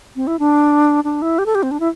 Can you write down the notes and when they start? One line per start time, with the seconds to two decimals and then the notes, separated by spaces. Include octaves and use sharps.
0.16 C4
0.27 E4
0.39 D4
1.04 D4
1.22 E4
1.39 G4
1.46 A4
1.55 G4
1.63 C4
1.71 D4
1.80 E4